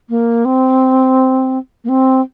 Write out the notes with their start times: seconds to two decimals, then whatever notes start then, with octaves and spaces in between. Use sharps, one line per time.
0.09 A#3
0.45 C4
1.84 A#3
1.88 C4